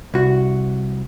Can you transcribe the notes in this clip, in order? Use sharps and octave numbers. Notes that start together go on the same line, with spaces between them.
C2 F#4